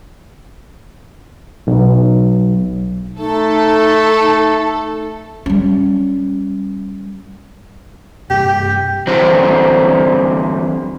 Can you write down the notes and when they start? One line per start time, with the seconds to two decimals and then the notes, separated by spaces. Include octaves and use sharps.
1.67 B1
3.19 A3 D#4 A4
5.46 G3 C#4
8.30 G2 C3 G4
9.07 D3 E3 G3 C4 F#4 C5